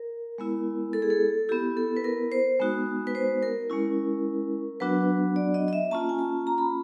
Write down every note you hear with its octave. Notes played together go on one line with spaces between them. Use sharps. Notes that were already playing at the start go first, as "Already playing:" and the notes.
Already playing: A#4
G#3 B3 E4
A4
G#4
A4
B3 E4 G4
A4
B4
A#4
C5
G#3 B3 D#4 F#4
B4
C5
A#4
G#3 C#4 E4
F#3 B3 D4 F#4 B4
D5
D#5
D#5
E5
A#3 C#4 F4 A5
G#5
A5
A#5
B5